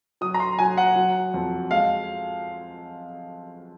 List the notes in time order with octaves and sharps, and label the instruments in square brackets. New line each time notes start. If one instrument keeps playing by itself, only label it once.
[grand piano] F#3 D#6
A#5
C6
F#3 G#5
F#5
F#3
F2
G#3 F5